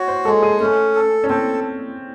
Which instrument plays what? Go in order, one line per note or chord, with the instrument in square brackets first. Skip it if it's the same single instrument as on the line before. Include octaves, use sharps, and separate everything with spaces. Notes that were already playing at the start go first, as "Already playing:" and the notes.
Already playing: [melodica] F#4 [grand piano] C#5
[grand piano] C5
[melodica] G#3 [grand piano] A4
[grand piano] G#4
[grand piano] A3 [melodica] C#4
[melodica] A4
[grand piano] C#4
[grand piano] C4 [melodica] A4